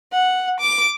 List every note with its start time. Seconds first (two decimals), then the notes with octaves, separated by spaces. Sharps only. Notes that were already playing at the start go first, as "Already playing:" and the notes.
0.12 F#5
0.60 D6